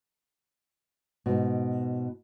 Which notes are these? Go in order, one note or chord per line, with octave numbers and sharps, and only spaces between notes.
G#2 B2